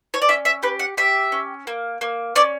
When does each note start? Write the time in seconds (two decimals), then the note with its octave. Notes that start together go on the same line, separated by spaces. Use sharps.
0.14 C#5
0.22 D5
0.28 C#4 E5
0.45 E5
0.63 G4 B4
0.79 F#5
0.97 G4 E5
1.32 C#4
1.67 A#3
2.01 A#3
2.35 C#4 D5